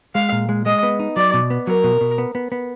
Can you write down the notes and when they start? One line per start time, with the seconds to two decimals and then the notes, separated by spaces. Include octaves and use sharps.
0.15 G#3 F5
0.32 A#2
0.49 G#3
0.66 G#3 D#5
0.83 B3
0.99 D#4
1.16 F#3 D5
1.34 B2
1.50 B3
1.67 F#3 A#4
1.84 B2
2.01 B2
2.18 B3
2.35 B3
2.52 B3